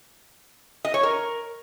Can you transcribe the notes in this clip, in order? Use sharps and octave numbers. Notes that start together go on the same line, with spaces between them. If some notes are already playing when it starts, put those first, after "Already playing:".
D#5
C#5
A#4